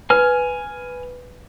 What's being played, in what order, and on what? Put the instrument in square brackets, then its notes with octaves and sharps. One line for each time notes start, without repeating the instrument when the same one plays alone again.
[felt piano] B4 [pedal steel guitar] G#5 F6